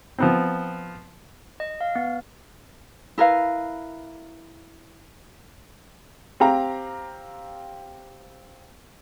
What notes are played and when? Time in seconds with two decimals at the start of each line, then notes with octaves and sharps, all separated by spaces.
0.19 F3 B3 C4
1.60 D#5
1.81 F5
1.96 B3
3.18 E4 A#4 B4 F5
6.40 C4 G4 F5 A#5